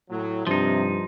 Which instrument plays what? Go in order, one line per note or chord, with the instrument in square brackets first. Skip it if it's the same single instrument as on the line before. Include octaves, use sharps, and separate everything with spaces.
[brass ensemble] A2 F#3
[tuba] G2 [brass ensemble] C3 [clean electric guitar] F3 D#4